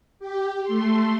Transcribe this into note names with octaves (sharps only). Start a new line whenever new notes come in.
G4
A3 C6